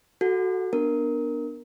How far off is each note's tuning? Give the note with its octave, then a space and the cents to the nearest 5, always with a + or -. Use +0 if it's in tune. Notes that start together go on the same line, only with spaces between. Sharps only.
F#4 +5 A4 +0 F#5 -25
B3 -5 D4 +15 A#4 +0